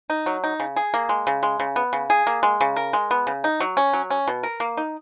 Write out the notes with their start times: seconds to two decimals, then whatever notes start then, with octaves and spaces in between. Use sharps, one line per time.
0.10 D#4
0.26 F#3
0.44 D#4
0.60 C#3
0.76 G#4
0.94 A#3
1.09 G#3
1.27 C#3
1.43 G#3
1.60 C#3
1.76 B3
1.93 C#3
2.10 G#4
2.27 A#3
2.43 G#3
2.61 C#3
2.76 A#4
2.93 G#3
3.11 B3
3.27 C#3
3.44 D#4
3.60 F#3
3.77 C#4
3.93 F#3
4.10 C#4
4.28 B2
4.43 A#4
4.60 A#3
4.77 D#4